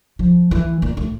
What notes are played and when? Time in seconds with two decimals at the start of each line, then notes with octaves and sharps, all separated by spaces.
0.19 F3
0.51 E3
0.82 A#2
0.97 A2